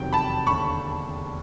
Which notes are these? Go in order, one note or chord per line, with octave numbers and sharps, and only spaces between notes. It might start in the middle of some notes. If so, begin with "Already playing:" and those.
Already playing: F1 E2 C3 D#3 F#3 G5
A5 B5
E1 D#2 D3 B5 C#6